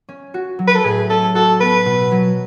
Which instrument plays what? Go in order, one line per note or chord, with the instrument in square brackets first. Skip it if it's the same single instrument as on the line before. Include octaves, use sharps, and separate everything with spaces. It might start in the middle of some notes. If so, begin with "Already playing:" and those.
[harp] C#4
F#4
F#3
[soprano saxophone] B4
A4
[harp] A2 [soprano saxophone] G#4
[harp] C#4 [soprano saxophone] A4
[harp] F#4 [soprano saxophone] A4
[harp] B3 [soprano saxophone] B4
[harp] B2
F#3